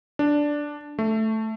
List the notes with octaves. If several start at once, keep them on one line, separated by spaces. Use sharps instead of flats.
D4
A3